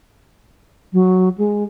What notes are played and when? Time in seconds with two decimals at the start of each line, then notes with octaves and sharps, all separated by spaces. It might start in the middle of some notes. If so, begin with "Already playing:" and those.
0.93 F#3
1.38 G#3